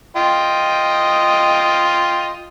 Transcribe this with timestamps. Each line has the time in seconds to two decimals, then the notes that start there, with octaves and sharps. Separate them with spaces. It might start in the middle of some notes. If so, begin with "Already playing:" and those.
0.16 F4 D#5 G5